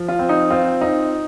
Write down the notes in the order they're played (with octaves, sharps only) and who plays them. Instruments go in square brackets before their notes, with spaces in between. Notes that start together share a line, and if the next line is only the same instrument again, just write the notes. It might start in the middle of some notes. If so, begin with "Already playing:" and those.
Already playing: [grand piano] F3
[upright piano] F4
[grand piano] C4
[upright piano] D#4
[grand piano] C4 [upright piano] F4
[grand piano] D#4